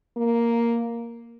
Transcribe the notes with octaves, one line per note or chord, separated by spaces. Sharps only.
A#3